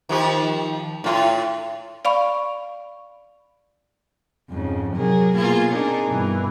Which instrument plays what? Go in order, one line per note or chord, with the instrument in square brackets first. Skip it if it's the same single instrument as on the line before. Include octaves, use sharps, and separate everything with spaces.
[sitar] D#3 F3 G4
A2 F4
[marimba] D5 F5 B5 C#6
[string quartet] F2 G#2 C#3
C3 F#3 G#4 A#4
B2 A#3 F4 G#4 G#6
C4 D4 D#4 G#4 A#4
G2 B2 E3